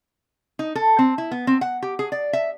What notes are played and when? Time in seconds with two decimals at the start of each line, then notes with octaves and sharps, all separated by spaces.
0.59 D#4
0.75 A4
0.99 C4
1.18 E4
1.31 B3
1.47 C4
1.61 F#5
1.82 G4
1.99 G#4
2.12 D5
2.33 E5